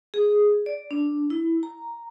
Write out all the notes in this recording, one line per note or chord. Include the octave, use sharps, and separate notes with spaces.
G#4
D5
D4
E4
A#5